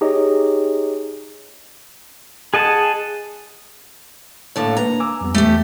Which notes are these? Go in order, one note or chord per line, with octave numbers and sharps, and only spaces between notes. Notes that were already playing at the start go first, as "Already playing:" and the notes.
D#4 G4 G#4 C#5 D#5
G#4 D#5 F#5 A5
A2 D3 A#3 C#5 A5
A#3 D4 B4 A#5
G#5 D6 E6
F2 G3 B3
E2 A3 G4